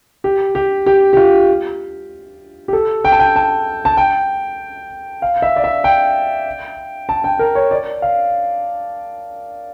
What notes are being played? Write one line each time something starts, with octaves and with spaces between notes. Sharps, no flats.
G4
G4
G4
G4
F4
G4
A4
G5
A5
G5
A5
A5
G5
F5
E5
D5
E5
G5
A5
G5
A#4
C#5
D5
F5